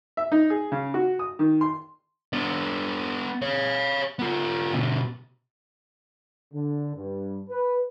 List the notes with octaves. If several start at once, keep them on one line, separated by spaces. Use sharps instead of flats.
E5
D#4
G#4
C#3
F#4
D#6
D#3
C6
B3 D4
C#5 F5
B3 F4
B2 D3
D3
G2
B4